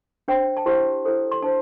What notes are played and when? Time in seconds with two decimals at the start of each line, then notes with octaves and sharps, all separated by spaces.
0.28 D4 C5 G5
0.57 A5
0.66 E4 G4 C5 C6
1.05 E4 A4 C5
1.31 C6
1.42 D4 C5 A5